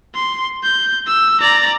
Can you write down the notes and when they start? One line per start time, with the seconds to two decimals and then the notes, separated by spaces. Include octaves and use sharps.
0.15 C6
0.63 G6
1.07 E6
1.40 D5 A#5